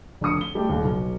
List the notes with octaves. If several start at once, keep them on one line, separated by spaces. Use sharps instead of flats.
F1 D3 D#6 C#7
G7
G3 A3 G4
D#1 D#2
B1